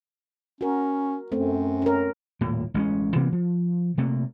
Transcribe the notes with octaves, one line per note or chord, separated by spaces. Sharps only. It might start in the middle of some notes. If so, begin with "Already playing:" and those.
C#4 F#4 A#4
F#2 A3 C4
C#4 A#4
D#1 A2 A#3
A1 G#3 C4 C#4
C3 E3 A#3 B3
F3
C3 A3 A#3